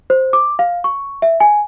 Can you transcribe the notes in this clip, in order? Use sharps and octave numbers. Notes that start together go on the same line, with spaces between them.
C5
D6
F5
C#6
E5
G#5